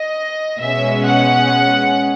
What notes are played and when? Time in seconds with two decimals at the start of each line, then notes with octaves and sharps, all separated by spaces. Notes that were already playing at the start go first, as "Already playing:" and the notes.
Already playing: D#5
0.61 B2 G#3 C#4 E5
1.06 F#5